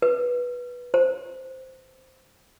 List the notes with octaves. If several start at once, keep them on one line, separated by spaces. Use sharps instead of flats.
B4
C5